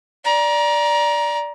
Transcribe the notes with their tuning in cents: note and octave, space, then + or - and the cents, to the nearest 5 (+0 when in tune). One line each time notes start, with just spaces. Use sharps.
D5 -5 A#5 +25